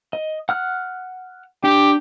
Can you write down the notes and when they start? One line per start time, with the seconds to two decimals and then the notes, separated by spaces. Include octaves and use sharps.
0.13 D#5
0.49 F#5 F6 F#6
1.64 D4 G4